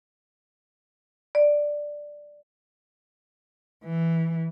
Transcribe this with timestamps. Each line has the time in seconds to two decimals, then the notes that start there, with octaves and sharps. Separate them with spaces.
1.35 D5
3.84 E3